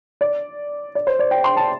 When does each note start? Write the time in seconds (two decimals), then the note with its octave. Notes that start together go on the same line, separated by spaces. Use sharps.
0.21 D5
0.95 D5
1.07 C5
1.19 D5
1.31 G5
1.44 C6
1.57 A5